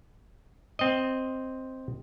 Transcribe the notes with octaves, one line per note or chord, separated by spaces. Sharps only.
C4 D#5